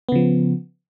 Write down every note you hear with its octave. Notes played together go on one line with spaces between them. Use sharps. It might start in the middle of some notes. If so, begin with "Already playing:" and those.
C#3 F3 B3